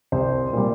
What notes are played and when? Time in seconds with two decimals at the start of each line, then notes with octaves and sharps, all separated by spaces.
0.12 C2 C5
0.53 A#2 G3